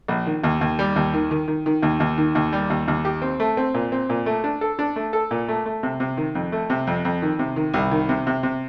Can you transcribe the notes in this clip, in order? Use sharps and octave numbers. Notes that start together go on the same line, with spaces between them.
A#1
D#3
D#2
D#2
G3
D#2
D#3
D#3
D#3
D#3
D#2
D#2
D#3
D#2
G3
D#2
D#2
G4
C4
A3
C4
A#2
C4
A#2
A3
D4
A4
D4
A3
A4
A#2
A3
A3
C3
C3
D#3
F2
A3
C3
F2
F2
D#3
C3
D#3
C2
D#3
C3
C3
C3